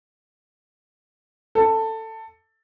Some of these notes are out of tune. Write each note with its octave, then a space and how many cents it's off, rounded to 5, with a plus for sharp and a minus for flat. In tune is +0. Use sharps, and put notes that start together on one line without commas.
A4 +15